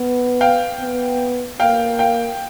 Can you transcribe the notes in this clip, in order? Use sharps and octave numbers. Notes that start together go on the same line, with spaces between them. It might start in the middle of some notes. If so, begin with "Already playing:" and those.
Already playing: B3
F5 G5
B3
A#3 F5 G5
F5 G5